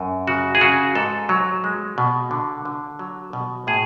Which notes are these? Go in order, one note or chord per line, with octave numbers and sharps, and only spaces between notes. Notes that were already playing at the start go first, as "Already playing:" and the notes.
Already playing: F#2
C#3 F#4
G#4
C#3 F#4
G#2 A4
F#3
G#3
B2
D3
D3
F#3
B2
A2 G#4